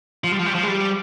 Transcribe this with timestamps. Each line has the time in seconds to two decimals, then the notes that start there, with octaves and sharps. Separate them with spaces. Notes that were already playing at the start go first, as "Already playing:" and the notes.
0.24 F3
0.32 G3
0.39 F3
0.46 G3
0.55 F3
0.63 G#3
0.67 G3